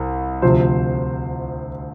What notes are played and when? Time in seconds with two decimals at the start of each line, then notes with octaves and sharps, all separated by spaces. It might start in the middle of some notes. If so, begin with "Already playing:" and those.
Already playing: C2
0.42 D2 C3 F3 C5